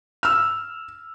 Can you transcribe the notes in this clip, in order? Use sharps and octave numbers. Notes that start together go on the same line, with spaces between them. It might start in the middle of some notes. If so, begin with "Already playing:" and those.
E6 F6